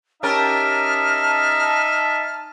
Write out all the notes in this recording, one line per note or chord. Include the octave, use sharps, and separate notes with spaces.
C#4 D#4 G4 A#4 D#5 E5 A5 F6